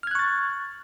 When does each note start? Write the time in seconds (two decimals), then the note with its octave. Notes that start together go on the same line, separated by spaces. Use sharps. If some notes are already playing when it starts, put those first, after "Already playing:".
0.03 F6
0.07 G#6
0.11 F#6
0.15 C#6
0.19 A6